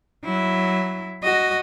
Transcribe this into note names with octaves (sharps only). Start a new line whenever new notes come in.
F#3 E4
F#4 D#5